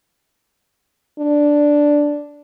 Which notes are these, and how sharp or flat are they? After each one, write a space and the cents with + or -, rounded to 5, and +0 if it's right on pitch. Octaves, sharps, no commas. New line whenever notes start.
D4 -5